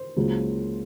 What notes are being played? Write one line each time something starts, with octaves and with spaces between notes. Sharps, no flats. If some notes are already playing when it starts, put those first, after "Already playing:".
Already playing: C5
C#2 C#3 F#3 A#3